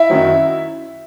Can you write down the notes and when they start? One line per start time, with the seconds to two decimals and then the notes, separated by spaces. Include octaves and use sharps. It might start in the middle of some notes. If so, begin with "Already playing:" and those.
Already playing: E4 E5
0.10 F#2 D#3 F#3